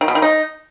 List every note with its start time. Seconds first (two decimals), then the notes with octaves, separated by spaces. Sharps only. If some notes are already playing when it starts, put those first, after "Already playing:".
0.01 D#3
0.08 B2
0.15 D#3
0.22 D#4